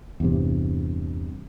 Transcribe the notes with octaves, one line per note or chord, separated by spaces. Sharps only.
E2 G2 C3